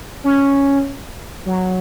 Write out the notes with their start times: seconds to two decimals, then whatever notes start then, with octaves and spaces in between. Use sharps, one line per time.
0.24 C#4
1.46 F#3